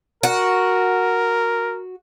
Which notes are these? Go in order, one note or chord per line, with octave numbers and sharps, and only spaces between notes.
F#4 A#4